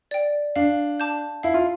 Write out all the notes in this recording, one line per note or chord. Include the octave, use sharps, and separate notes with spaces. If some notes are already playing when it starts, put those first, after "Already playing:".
D5 G5
D4 F5
A5 D6 G6
E4 F5
F4